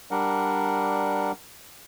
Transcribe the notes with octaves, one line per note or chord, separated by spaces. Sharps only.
G3 D4 A#4 F#5